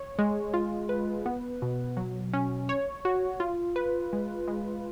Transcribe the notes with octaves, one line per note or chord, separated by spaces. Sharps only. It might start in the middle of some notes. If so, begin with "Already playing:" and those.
Already playing: C#5
G#3
F4
B4
B3
B2
F#3
C#4
C#5
F#4
F4
B4
G#3
G#3